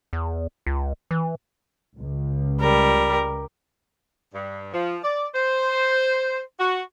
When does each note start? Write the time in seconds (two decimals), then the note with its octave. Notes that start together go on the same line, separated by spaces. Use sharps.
0.13 E2
0.66 C#2
1.11 E3
1.97 C#2
2.61 G3 A#4
4.34 G2
4.74 F3
5.04 D5
5.35 C5
6.60 F#4